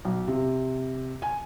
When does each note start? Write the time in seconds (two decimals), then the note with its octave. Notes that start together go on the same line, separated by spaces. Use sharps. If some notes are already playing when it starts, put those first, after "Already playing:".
0.05 B1
0.28 C3
1.22 G#5